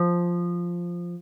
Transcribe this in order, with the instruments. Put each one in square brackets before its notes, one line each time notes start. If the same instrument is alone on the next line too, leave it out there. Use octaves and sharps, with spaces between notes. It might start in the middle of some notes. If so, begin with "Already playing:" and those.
Already playing: [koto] F3